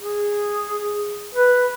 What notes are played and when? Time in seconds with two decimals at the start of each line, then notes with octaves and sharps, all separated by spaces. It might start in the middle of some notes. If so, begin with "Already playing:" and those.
0.01 G#4
1.35 B4